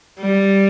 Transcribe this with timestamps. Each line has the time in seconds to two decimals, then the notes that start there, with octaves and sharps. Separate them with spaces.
0.20 G3